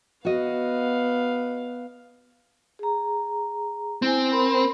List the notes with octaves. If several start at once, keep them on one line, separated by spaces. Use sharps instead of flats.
B3 F#4 D#5 F5
G#4 A#5
C4 E4 G#5
A#4 B5 C6